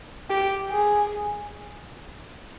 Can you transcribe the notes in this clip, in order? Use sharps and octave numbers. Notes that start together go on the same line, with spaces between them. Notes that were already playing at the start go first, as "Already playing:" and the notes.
G4
G#4